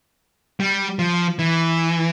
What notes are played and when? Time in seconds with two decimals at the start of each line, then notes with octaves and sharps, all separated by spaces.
0.60 G3
0.99 F3
1.39 E3